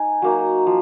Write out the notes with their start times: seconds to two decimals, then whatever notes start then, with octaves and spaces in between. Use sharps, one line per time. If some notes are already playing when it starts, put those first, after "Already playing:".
Already playing: D#4 G#5
0.22 F#3 A#3 D#4
0.67 F3